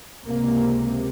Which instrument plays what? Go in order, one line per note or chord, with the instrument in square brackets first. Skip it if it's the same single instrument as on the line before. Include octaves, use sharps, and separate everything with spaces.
[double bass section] C#2 C3 A#3